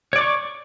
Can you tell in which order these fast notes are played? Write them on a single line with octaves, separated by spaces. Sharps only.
C#5 D5 D6 C#6